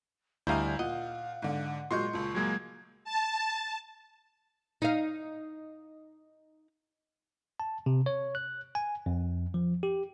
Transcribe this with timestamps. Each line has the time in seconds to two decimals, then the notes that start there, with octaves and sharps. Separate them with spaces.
0.47 D2 G3 E4 D#5 F5 G#5 A#5 G6
0.79 A#2 D#5 F5 F#5
1.42 G#2 D3
1.91 A#2 F#3 G#3 C6 C#6 G6
2.13 C#2 A#2 A5
2.35 F#3 G#3 A#3 G#6
3.04 A5
4.82 D#4 F5
7.60 A5
7.86 C3
8.06 C#5
8.35 F#6
8.75 G#5
9.06 F2
9.54 F3
9.83 G4